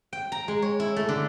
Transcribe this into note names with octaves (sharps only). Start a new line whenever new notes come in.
G5
A#5
G#3
C#5
E4
A3
D3